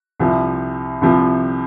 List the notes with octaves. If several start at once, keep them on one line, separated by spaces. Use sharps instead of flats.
C2 C3 F3
C2 C3 F3